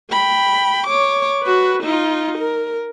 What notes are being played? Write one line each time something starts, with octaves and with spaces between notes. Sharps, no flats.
G5 B5
C#5 D6
F#4 B4
D#4 F4
A#4